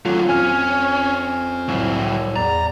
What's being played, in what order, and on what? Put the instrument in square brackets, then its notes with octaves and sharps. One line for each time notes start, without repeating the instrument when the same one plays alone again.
[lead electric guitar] D#2 F#3 [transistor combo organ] A3 C#4 [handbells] F4
[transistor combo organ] F2 C4 [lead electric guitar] C#4 [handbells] G#5 F6
[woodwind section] C2 A2 [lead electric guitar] F#3 E4
[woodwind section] E2 [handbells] D5 [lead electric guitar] A#5